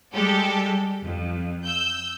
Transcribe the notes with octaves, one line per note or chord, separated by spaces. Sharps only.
G3 G#3 G4 A4
F2
E6 G6